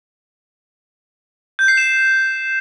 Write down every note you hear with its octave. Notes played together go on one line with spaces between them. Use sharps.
G6
C7
E7